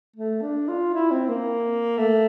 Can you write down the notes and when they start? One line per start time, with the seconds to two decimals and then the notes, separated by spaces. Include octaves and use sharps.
0.16 A3
0.42 D4
0.68 F4
0.94 E4
1.11 C4
1.29 A#3
1.98 A3